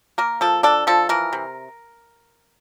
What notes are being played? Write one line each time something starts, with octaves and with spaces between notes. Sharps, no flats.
A#3 A#4
F3 A4
D4 A4
F3 A4
E3 A#4
C3